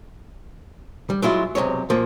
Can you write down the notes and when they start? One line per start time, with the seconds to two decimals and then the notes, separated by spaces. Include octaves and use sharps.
1.10 G3
1.22 F#3 G#3 E4 F4
1.55 B1 E2 C3 G#3 C#5
1.90 A#2 F3 A#3